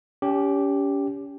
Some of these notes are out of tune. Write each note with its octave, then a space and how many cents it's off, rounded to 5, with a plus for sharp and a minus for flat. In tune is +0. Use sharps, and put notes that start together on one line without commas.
C#4 +35 G4 +0